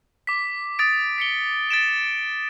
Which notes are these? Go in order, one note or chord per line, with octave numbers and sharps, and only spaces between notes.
D6 B6
D#6 A6 D7
B6 C#7 G7
A6 B6 D7 E7